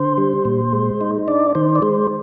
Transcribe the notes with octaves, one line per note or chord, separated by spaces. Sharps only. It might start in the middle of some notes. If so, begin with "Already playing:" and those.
Already playing: D3 C5
G3
A#2
G#3
D#4
D4 D5
D#3 C5
D5
G#3 C5